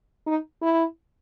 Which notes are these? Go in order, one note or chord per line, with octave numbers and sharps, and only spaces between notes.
D#4
E4